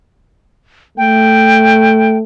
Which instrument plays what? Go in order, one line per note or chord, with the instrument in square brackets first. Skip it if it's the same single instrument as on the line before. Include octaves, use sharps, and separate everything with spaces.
[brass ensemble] A3 [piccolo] G5